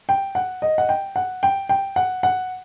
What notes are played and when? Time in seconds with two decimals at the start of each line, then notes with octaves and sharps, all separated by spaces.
0.09 G5
0.35 F#5
0.62 D#5
0.78 F#5
0.89 G5
1.16 F#5
1.43 G5
1.69 G5
1.96 F#5
2.23 F#5